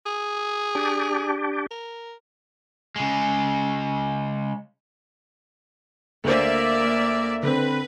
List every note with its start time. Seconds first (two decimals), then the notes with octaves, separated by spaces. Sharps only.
0.06 G#4
0.75 D4 G4
1.71 A#4
2.96 C#3 G#3
6.24 D2 A#3 C5 D5 E5
7.43 D3 C4 B4